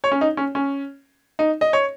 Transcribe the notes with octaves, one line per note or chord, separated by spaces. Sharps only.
C#5
C#4
D#4
C#4
C#4
D#4
D#5
C#5